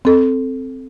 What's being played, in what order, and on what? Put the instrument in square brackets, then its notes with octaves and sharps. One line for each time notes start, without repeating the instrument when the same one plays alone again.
[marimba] C4 A4